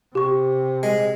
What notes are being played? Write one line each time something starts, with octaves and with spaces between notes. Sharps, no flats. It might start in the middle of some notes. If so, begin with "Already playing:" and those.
C3 G4 C#6
G#3